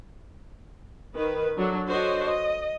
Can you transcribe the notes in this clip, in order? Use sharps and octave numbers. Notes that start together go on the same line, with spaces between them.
D#3 B4
F#3 D4 A4
D4 F#4 A4 C5 C#5 D#5
D#5